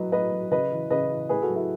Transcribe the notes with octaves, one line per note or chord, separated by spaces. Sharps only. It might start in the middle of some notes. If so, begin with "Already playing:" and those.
Already playing: A2 F#3 B4 D#5
A2 B4 D#5
F#3
C#3 B4 D#5
E3
C#3 B4 D#5
E3
A2 G#4 B4
F#4 A4
F#3
E4 G#4